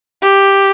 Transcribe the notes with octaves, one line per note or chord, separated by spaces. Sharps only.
G4